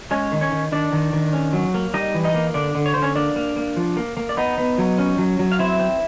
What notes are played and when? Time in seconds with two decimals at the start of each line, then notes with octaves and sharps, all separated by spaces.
0.11 G#3 C#4 C#5
0.32 D#3
0.41 C#4 C#5
0.52 D#3
0.72 D#3 D4 D5
0.92 D#3
1.13 D#3
1.33 C#4
1.53 F#3
1.74 A#3
1.94 G3 D#4 D#5
2.14 E3
2.24 D#4 D#5
2.34 A#3
2.54 D3 D4 D5
2.75 D3
2.86 C#5
2.94 D3 C5
3.02 C#4 C#5
3.15 A#3 D4 D5
3.36 A#3
3.56 A#3
3.76 F3
3.97 A#3
4.17 A#3
4.29 D5
4.37 B3 D#4 D#5
4.58 B3
4.78 F#3
4.98 C#4
5.18 F#3
5.39 F#3
5.52 F5
5.59 C4 E4 E5
5.80 C4